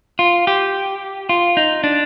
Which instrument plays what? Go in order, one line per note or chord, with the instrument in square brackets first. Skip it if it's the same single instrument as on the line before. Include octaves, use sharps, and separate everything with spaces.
[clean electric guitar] F4
G4
F4
D#4
D4